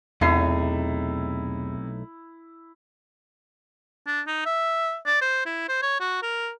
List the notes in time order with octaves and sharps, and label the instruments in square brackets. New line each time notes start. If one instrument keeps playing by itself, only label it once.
[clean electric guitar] B1 A3 D#4 [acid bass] E2 [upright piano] C3 C7 [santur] E4
[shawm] D4
D#4
E5
D5
C5
E4
C5
C#5
F#4
A#4